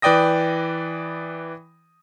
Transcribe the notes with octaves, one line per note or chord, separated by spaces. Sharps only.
E3 B4 D5 G5 D#6 A#6